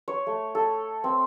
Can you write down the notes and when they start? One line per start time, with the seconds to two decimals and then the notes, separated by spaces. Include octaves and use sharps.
0.08 C#5
0.27 A3
0.55 A4
1.04 C4